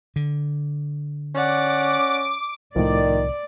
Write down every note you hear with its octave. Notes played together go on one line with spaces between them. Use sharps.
D3
C#4 D5 F#5 D6
C2 A2 D#3 F3 D5